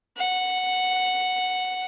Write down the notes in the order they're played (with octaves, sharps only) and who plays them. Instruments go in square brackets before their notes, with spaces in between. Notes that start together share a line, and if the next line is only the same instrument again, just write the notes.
[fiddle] F#5